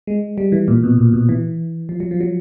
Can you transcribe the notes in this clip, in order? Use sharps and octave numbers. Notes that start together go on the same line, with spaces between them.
G#3
G3
E3
A#2
B2
A#2
B2
E3
F3
F#3
F3
F#3